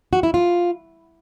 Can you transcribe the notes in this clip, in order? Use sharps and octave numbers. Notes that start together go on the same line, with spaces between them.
F#4
E4
F4